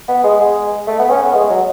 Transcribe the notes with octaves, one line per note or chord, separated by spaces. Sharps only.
B3
G#3
G#3
A3
B3
C#4
B3
G#3
F#3